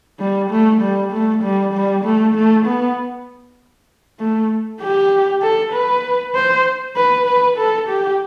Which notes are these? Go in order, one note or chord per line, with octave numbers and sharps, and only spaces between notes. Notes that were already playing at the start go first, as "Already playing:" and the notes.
G3
A3
G3
A3
G3
G3
A3
A3
B3
A3
G4
A4
B4
C5
B4
B4
A4
G4